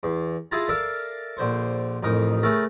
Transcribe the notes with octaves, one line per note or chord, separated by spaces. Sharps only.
E2
E4 F4 G#4 A5 A#5
A4 A#4 D5 E5 F5
A#1 D3 C5 C#6
A1 F2 D#4 A#4
C#3 A3 A4 A#4